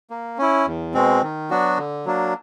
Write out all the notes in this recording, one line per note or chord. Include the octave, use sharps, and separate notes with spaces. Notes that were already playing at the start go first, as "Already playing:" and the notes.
A#3
C#4 E4
E2
B2 G#3 C4
D#3
F#3 B3 D4 F#4
D3
F#3 A#3 D4